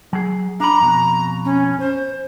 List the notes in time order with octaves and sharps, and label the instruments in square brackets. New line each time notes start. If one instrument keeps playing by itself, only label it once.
[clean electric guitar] F#3 G#4
[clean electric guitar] D4 B5 [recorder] A#5
[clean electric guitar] F2 B2
[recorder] C#4
C5